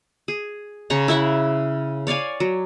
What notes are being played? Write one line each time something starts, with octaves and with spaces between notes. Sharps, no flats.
G#4
C#3 C#5 A#5 C#6
E4 E5 F#5
C#5 D5 F5 G#5
F#3